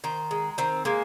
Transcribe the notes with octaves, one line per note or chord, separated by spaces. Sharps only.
D#3 C5
G#3
D#3 C4
G#3 A#3